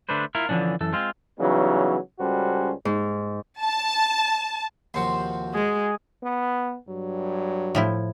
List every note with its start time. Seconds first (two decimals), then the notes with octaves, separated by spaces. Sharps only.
0.09 D3 A3 D4 B4 C5
0.35 E4 F4 A#4
0.49 D3 E3 F3 C#4 D4
0.81 F#2 E3 A4
0.93 G#3 C4 F4
1.39 C#3 E3 F#3 G3 B3 D#4
2.20 C#2 G3 C#4 F#4 A4 C5
2.85 G#2
3.61 A5
4.94 D#2 C3 F3 F#4 C5 C6
5.54 G#3 G#4
6.23 B3
6.89 G2 F#3
7.75 A2 F3 E4